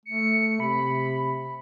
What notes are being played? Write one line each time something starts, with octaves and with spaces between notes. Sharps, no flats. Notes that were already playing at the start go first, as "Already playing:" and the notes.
A3 C#7
C3 B5